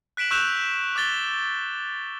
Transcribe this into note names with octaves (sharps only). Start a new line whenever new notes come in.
F#6 B6 D7 E7 F#7
C#6 E6 F#6 G6 E7 F7
D6 F#6 A6 G7